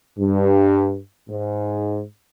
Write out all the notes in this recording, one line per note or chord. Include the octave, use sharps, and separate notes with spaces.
G2
G#2